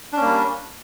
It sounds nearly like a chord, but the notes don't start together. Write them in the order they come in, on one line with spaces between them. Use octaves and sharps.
D4 C#4 A#3 G3